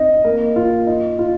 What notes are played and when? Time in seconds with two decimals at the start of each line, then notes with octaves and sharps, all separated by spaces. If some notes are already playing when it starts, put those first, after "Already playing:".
Already playing: C4 D#4 D#5
0.24 A#3 A#4
0.56 F4
0.87 D#4
1.19 F4